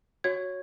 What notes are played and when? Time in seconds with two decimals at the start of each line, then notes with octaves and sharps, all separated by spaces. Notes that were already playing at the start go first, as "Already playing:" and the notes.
0.24 F#4 C#5 G#6